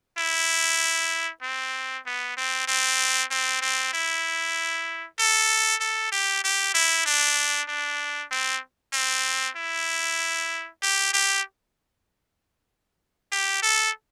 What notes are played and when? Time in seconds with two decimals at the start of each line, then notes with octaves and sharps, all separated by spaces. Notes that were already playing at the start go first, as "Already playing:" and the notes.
0.18 E4
1.42 C4
2.06 B3
2.37 C4
2.67 C4
3.31 C4
3.61 C4
3.93 E4
5.19 A4
5.80 A4
6.12 G4
6.44 G4
6.74 E4
7.06 D4
7.68 D4
8.31 C4
8.93 C4
9.56 E4
10.82 G4
11.13 G4
13.32 G4
13.62 A4